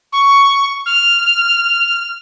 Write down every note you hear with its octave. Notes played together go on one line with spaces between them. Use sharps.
C#6
F6